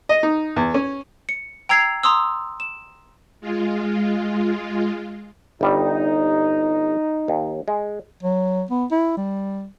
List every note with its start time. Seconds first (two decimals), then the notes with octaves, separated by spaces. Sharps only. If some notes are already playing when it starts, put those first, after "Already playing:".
0.09 D#5
0.23 D#4
0.56 E2
0.74 C#4
1.29 C#7
1.69 G5 A#5 E6 G#6 C7 F7
2.03 A#5 C6 D#6 E6
2.60 E7
3.41 G#3 F4
5.61 G1 G3 D#4
7.28 D#2
7.68 G#3
8.23 F#3
8.70 B3
8.91 E4
9.17 G3